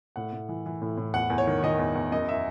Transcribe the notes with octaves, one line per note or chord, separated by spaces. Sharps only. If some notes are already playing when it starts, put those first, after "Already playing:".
A2 F#5
A2
E3
E3
A2
A2
E2 F#5
E2
C#5
D#3
D#3 D#5
E2
E2
F#2 D#5
E5